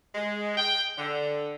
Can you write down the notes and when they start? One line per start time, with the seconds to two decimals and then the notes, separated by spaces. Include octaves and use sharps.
0.14 G#3
0.57 G5
0.97 D3